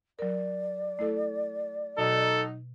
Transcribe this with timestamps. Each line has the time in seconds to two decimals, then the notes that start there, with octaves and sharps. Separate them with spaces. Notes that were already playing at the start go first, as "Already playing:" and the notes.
0.19 F#3 A#4 D5
0.99 A3 E4 A4
1.98 B2 F#3 D#4 A4